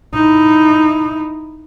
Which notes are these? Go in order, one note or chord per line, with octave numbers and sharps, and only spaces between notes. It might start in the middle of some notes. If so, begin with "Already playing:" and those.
D#4 E4